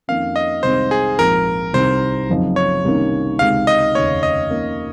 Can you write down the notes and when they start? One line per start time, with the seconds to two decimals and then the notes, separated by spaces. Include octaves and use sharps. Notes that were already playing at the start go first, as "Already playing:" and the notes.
0.08 F2 D#3 A#3 C#4 F5
0.36 D#5
0.63 C2 C3 D#3 G#3 C4 C5
0.91 G#4
1.18 A#1 G#2 F3 C4 A#4
1.73 C2 C3 D#3 C5
2.29 F#1 F#2 F3 C4 D#4
2.56 C#5
2.84 C2 C3 D#3 A#3 C#4
3.39 C#2 C3 D#3 G#3 F5
3.67 D#5
3.95 F1 D#2 C#3 C#5
4.23 D#5
4.50 F2 D#3 A#3 C#4